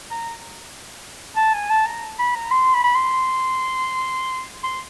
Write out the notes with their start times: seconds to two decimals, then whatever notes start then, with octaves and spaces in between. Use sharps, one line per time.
0.11 A#5
1.37 A5
1.54 G#5
1.70 A5
1.86 A#5
2.19 B5
2.35 A#5
2.51 C6
2.74 B5
2.84 B5
2.95 C6
4.64 C6